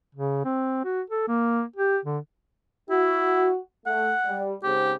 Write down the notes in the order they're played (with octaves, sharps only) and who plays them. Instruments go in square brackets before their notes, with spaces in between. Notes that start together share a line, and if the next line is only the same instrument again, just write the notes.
[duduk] C#3
C4
F#4
A4
A#3
G4
D3
[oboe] E4 [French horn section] F#4
[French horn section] A3 [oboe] F#5
[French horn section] G3
[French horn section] G#2 C#3 C4 [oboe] G4